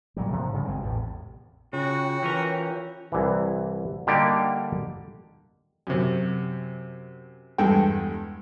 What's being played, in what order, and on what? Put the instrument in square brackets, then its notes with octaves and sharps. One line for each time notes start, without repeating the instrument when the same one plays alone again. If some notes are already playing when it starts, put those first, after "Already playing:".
[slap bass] A#2 F#3 G3
G#2 C3 F3
C#3 G3
G#1 G2 G#3 C4
A1 E2 A2 C3
[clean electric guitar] C#3 [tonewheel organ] F4 C#5 G5 [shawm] F#4
[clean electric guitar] E3 C#4 A#4
[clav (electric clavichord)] C2 E3
D3 G3 A#3 D#4 G4 D5
[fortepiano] F#2 C3
E2 G2 G#3 A4 G5